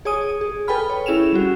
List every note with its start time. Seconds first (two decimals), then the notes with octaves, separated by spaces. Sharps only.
0.05 G#4 C#5 G#5 D#6 D#7
0.41 G#4
0.68 A4 B4 G5 G#5 B5 F6
0.90 C#5
1.06 C#4 E4 G#4 C#5 E7 F7
1.33 G3 C#4 F#4